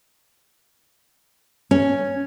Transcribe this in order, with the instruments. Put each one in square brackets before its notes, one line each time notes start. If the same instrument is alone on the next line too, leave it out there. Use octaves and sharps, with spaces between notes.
[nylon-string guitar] C#4